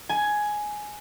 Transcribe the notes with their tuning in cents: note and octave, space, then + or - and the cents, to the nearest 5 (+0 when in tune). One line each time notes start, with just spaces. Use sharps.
G#5 +10